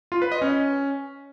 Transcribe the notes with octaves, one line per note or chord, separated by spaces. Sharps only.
F4
B4
D#5
C#4